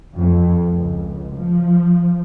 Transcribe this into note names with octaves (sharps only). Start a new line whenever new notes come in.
F2
C#2
F3